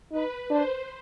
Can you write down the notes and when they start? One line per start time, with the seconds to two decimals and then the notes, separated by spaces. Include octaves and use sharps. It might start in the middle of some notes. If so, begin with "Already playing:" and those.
0.12 D#4 B4
0.50 D4 C5